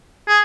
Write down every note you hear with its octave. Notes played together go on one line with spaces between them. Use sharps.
G#4